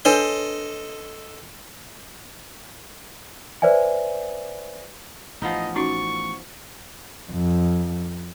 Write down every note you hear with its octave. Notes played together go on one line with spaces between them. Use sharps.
D4 A4 B4 C#5 D#5 C6
B4 C5 D5 E5 G#5
A1 F3 B3 D#4 D#5
C#4 D#4 F#4 D5 C#6
F2